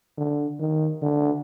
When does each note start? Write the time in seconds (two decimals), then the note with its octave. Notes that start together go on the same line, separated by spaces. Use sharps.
0.18 D3
0.59 D#3
1.02 D3